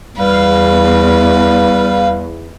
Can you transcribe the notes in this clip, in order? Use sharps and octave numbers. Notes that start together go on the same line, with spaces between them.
E2 G3 B4 F5